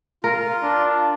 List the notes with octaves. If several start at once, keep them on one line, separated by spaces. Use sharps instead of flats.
F4 A#4
D4